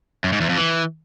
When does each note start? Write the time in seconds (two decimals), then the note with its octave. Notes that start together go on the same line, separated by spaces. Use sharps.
0.24 F#2
0.32 G#2
0.41 E2
0.49 F2
0.57 E3